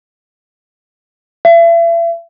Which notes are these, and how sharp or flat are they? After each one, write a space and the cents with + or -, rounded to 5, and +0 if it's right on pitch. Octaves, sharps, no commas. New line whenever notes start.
E5 +40